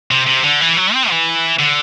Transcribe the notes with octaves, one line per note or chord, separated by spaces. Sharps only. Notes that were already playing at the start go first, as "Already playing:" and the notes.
C3
C3
D3
E3
F#3
C4
E3
D3